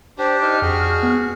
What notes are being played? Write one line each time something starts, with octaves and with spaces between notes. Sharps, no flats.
D4 G4 C5 D5
D#4 F6
F2 F#4 G#4
B3